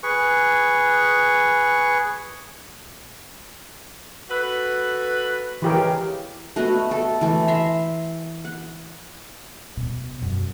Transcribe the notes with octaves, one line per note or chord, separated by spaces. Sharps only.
G#4 B4 C#6
F#4 A4 B4
G#2 C#3 E3 G4 A#4
A3 B3 F#4 D#5
A4
E3 A3
E5 A#5 C6
F#5
B2
F#2